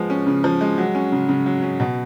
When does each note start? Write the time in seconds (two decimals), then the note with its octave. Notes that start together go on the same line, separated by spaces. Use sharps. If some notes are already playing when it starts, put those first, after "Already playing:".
Already playing: F3 G#3 B3
0.10 C#4
0.27 C#3
0.44 F3
0.61 G#3
0.78 F#3
0.95 C#4
1.12 C#3
1.29 C#3
1.46 F#3
1.63 C#4
1.80 B2